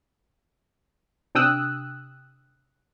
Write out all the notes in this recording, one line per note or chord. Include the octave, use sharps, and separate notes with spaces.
C3 D4 G5 D#6 E6 F#6